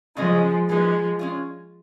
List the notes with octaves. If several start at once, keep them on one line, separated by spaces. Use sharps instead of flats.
C#3 F3 F#3 G#3 C#4 G#4 D#5
F3 G#3 A#3 D#4 F#4 B4 D#5
G#3 C#4 F4